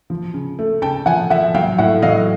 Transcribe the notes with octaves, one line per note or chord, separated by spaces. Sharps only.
F3
C#3
A3
C#3 G5 A5
F3 F#5 G#5
F3 E5 F#5
F#3 F5 G5
A2 E5 F#5
F#3 D#5 F5